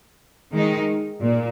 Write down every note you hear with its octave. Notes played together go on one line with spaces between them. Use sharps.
D#3 G#3 D#4
A#2